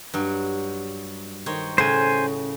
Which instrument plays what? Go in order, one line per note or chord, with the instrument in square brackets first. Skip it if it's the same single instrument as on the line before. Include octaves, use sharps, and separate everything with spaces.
[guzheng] G2 F#3
D#3 C5 C#5
[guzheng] A2 C#3 [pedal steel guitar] C5 G#5